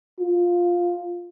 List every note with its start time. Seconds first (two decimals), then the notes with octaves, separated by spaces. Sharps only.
0.20 F4